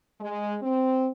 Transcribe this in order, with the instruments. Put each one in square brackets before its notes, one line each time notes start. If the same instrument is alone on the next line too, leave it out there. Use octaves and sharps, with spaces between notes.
[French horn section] G#3
C4